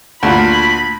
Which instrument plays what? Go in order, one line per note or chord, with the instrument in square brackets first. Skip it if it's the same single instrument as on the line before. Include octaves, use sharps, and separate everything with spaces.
[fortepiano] D2 A#2 [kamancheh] B5